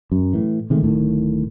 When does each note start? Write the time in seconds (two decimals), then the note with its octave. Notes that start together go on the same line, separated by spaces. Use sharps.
0.12 F#2
0.33 A2 E3
0.70 C3 D#3 G#3 A3
0.82 D1 A2 D#3